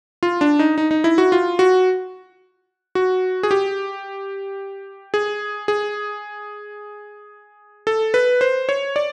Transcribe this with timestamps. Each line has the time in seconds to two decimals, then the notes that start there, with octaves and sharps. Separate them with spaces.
0.23 F4
0.41 D4
0.59 D#4
0.78 D#4
0.91 D#4
1.04 E4
1.18 F#4
1.32 F4
1.59 F#4
2.95 F#4
3.43 G#4
3.51 G4
5.14 G#4
5.68 G#4
7.87 A4
8.14 B4
8.41 C5
8.69 C#5
8.96 D5